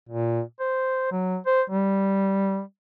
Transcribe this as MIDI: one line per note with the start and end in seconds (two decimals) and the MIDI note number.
0.09 0.41 46
0.60 1.10 72
1.12 1.37 54
1.46 1.62 72
1.70 2.61 55